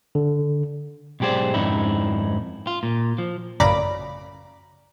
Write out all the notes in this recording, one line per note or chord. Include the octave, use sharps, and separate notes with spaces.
D3
B1 G#2 G4 G#4 C5 D5
F2 G#2 C#4 D#4 E4
F4
A#2
F3
A1 F#2 C#3 D5 A#5 B5